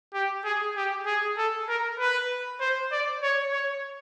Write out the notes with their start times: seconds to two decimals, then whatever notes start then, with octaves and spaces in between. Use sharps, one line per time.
0.14 G4
0.45 G#4
0.76 G4
1.06 G#4
1.37 A4
1.68 A#4
1.99 B4
2.60 C5
2.91 D5
3.22 C#5
3.52 C#5